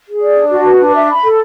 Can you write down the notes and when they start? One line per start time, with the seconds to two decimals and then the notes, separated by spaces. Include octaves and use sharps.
0.08 G#4
0.22 D5
0.37 D4
0.51 F#4
0.65 B4
0.80 D4
0.95 E5
1.09 B5
1.24 A4